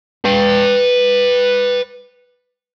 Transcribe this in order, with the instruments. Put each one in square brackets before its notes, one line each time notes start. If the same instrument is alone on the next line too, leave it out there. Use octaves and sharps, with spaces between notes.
[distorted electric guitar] B4 G5